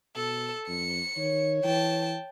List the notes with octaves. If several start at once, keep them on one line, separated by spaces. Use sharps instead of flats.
B2 A4
F2 C#7
D#3 C#5
E3 G5 A5